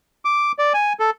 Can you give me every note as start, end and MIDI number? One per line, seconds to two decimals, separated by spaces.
0.25 0.52 86
0.59 0.73 74
0.74 0.93 80
1.00 1.10 69